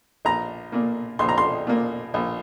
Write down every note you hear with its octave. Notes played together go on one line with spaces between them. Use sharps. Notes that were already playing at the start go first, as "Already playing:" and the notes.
A#1 A#5
A#2 A#3
A#1 C6
A#5
C6
A#2 A#3
A#1